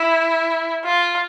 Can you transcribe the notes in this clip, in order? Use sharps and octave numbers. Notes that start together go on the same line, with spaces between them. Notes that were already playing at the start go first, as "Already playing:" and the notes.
Already playing: E4
F4